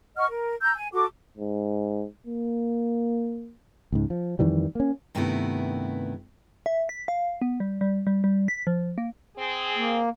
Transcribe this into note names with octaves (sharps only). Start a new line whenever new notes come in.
D#5 F#5 C#6 F6
A#4
A#5 E6 G6
G#5
F#4 A4 D6
G#2
A#3
C#2 G#2
F3
F2 D#3 E3 G3
A#3 C#4
G2 C3 D#3 A3 B3 E4
E5
B6
F5
B3
G3
G3
G3
G3
B6
F3
A#3
C4 G#4
A#3